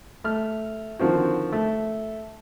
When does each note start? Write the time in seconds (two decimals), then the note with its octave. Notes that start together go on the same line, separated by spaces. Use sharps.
0.24 A3 F6
0.99 D3 D#3 F3 C4 F#4
1.53 A3